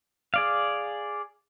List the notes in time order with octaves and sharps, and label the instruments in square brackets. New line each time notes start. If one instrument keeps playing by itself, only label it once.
[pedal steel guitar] G#4 D5 F5